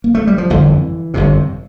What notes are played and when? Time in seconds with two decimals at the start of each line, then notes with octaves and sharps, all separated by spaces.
0.04 A#3
0.15 A3
0.27 G3
0.38 F3
0.50 G1 F2 D3 E3
1.14 G1 F2 C3